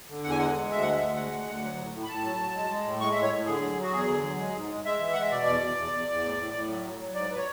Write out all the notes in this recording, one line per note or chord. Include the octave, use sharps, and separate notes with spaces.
D3
E2 F#5
G#5
G#3 F#5
G#3
D2 E5
G#3 F#5
E5
D2
G#3 F#5
D2
D2
F#3
A2
A2
B5
A2 A5
F#3
F#3
G#3
G#3
A2
G#3 C#6
E5
A2
C#5
A2
D3 G#4
F#3
F#3
F#4
E2 G#4
D3
F#3
G#3
G#2
G#3
G#3 E5
E3
G#3 F#5
E5
B2 D5
E2
E2
E2
E2
E2
A2
A2
A2
F#3
F#3
F#3
G#2 D5
B4
C#5